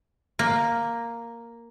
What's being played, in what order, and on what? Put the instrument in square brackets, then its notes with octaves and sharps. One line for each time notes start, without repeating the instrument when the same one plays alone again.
[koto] A#3